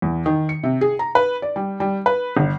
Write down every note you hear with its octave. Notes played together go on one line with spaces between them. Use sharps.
E2
D#3
C#7
C3
G#4
A#5
B4
D5
G3
G3
B4
G1